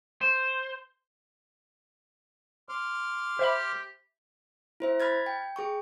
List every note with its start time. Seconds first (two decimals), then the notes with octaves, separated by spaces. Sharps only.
0.21 C5
2.69 C6 D6 F6
3.39 G4 C5 E5 B5
4.80 E4 C5 E5
5.00 B5 F6 G#6 A6
5.26 G5
5.56 G#4 G5 C#6